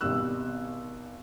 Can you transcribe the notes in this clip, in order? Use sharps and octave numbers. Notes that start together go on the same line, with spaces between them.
G#1 B2 G3 E6 F#6